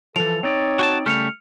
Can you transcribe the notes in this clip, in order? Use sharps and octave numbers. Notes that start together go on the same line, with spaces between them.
E3 F3 A4 F7
C4 D#4 C#5 D5
F#4 G#5 A5
C#3 G3 A3 F6 C#7 F7